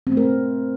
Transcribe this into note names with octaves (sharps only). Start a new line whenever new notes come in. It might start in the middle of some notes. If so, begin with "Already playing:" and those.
C4
A3
A#4